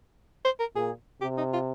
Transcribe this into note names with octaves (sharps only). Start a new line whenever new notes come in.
C5
A#4
A#2 G#4
C3 G4
D#4
F4